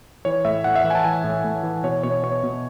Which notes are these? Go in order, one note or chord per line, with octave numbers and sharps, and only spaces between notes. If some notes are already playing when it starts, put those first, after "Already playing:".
E3 C#5
A2 E5
A2 F#5
E5
E3 F#5
G#5
A5
E3 G#5
A2
A2
E3
B2 C#5
B2 C#5
B2 C#5
B2